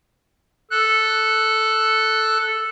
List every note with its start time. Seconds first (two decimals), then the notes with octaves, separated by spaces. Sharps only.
0.71 A4 F#6